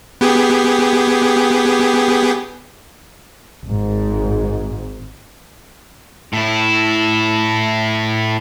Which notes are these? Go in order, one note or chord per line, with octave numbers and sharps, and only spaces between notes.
B3 G4 G#4
G#1 G#2
A2 E4